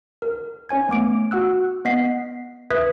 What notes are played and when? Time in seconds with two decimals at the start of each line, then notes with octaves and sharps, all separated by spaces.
0.22 A#4
0.69 C#4 C#5 G#5 G#6
0.89 A3 B3 D6 D7
1.31 F#4 F#5 E6 F#6
1.85 B3 D#5 F#5 B6 C7
2.70 B4 E5 D#6 F#6 G#6 B6